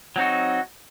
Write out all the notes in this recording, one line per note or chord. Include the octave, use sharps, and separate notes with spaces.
F#3 C4 D#4 F#4